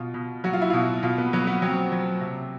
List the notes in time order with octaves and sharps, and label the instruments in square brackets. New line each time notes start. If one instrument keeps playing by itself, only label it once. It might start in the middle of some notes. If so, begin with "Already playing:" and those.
Already playing: [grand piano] B2 F4
B2
F#3 F#4
F4
E4
B2 F4
B2 F4
B3
F#3 B3
B3
F#3 C4
F#3
C3